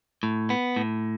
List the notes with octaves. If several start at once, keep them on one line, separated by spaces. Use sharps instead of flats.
A2
B3
A2